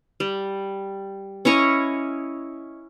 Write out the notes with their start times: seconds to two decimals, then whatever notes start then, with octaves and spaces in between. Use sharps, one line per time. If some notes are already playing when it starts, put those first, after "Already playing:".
0.20 G3
1.45 C#4 E4 C#5 D#5